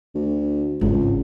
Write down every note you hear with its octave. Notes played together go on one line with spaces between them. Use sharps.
D2
G#1 C#2 G#2